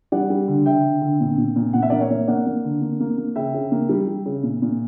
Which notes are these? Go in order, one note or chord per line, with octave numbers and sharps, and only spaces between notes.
G3 D5 F#5
G3
D3
D3 E5 G5
D3
D3
A#2
A#2
A#2
A#2 F#5
E5
A#3 D5 F#5
C#5 E5
A#3
A#3 D5 F#5
A#3
D3
A#3
A#3
A#3
C#3 E5 G5
C#3
A#3
G3
G3
C#3
A#2
A#2